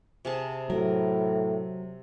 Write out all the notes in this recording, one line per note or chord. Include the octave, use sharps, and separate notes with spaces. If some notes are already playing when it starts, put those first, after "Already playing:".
C3 G#4 A5
A2 F#3 A#4